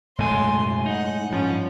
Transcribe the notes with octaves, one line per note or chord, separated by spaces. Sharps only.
B1 F#2 A2 G#3 G#5 C6
D#4 F#5
G2 F3 C#4